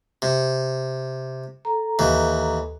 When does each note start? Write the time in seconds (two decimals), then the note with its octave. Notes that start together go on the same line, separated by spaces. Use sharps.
0.22 C3
1.65 A4 A#5
1.99 D#2 E3